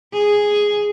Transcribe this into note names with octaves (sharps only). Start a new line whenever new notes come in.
G#4